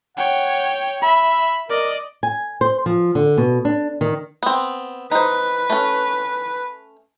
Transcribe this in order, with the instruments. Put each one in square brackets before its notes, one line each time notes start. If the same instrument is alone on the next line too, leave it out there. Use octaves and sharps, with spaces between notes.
[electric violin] C#5 G5 [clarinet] F#5
[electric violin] E5 [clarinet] B5
[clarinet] A#4 [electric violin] D5 D#5
[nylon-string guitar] G#5
C5
F3
D3
B2
D4
D#3
[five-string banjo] B3 C4
[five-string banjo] D#4 C5 [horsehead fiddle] B4
[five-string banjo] A3 C#4